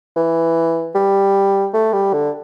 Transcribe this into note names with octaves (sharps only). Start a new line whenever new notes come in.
E3
G3
A3
G3
D3